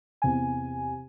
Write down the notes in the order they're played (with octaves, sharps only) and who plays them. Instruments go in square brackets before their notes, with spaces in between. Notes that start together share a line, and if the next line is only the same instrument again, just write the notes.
[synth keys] E2 C3 G#5